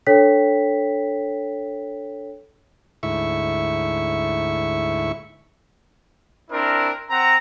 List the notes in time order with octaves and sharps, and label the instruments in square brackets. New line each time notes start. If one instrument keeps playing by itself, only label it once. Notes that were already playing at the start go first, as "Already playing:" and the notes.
[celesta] D4 A4 C#5 G5 B6
[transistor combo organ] D2 G#2 E4 E5 C#6
[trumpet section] C4 D4 E4 A#4
C4 F#5 A#5